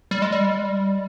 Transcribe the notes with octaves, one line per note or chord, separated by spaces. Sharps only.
G3
G#3
G3